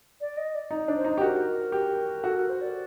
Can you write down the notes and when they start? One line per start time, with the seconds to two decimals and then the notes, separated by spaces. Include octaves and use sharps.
0.21 D5
0.37 D#5
0.55 D5
0.71 D#4
0.88 D4
0.97 C5
1.04 D#4
1.18 G4
1.21 F#4 A#4
1.72 G4
2.23 F#4 A4
2.36 A#4
2.49 C5
2.61 D5